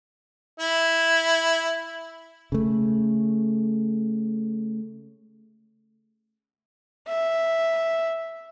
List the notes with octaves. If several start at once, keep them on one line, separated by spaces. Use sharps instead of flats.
E4
C#3 A3
E5